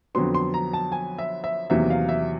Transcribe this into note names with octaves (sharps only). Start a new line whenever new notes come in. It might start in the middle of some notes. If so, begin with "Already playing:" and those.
F2 D3 F#3 B3 C6
C6
A#5
A5
G#5
E5
E5
E2 C3 D#3 F#3 A#3 E5
F5
E5